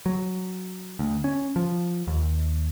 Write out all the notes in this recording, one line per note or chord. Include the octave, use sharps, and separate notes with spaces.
F#3
D2
C#4
F3
D#2